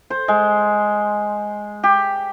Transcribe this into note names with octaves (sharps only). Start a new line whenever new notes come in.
C5
G#3
G4